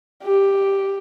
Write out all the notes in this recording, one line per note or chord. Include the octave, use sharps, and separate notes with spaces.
G4